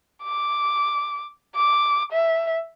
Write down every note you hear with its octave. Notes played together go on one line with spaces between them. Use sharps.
D6
D6
E5